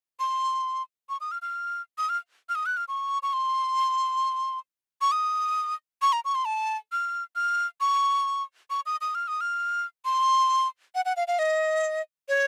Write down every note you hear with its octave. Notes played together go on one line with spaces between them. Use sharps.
C6
C#6
D#6
F6
F6
D#6
F6
F6
D#6
F#6
F6
C#6
C#6
C6
C#6
D#6
C#6
A#5
C#6
C6
A5
F6
F6
C#6
C#6
D#6
D#6
F6
D#6
F6
C6
F#5
F#5
F5
F5
D#5
C#5